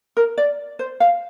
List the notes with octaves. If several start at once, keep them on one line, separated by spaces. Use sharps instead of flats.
A#4
D5
C5
F5